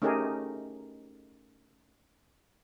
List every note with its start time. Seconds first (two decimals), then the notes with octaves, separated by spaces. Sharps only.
0.02 A3 C#4 D#4 G4 G#4 A#4